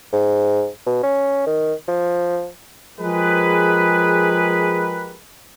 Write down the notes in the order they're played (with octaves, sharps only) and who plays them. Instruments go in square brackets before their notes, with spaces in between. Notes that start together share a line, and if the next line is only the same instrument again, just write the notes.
[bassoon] G#2
B2
C#4
D#3
F3
[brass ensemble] F3 G#3 G4 G#4 A#4 B4